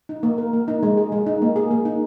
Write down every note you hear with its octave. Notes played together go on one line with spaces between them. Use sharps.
D#4
A#3
A#4
A#3
D#4
G#3
G#4
G#3
D#4
A#3
G#4
A#3
D#4